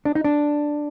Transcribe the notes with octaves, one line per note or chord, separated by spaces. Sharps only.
D4
D#4
D4